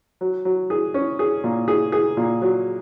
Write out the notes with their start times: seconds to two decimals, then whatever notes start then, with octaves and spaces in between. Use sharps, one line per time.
0.21 F#3
0.45 F#3
0.70 G#4
0.94 C#4
1.19 G#4
1.44 A#2
1.68 G#4
1.92 G#4
2.17 A#2
2.42 F#3